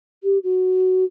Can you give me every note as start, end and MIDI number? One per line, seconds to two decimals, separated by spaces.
0.23 0.38 67
0.43 1.04 66